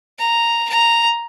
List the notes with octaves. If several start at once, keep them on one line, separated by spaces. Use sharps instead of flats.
A#5
A#5